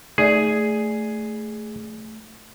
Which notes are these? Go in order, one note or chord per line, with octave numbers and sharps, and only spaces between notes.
A3 D#4 G#4 D5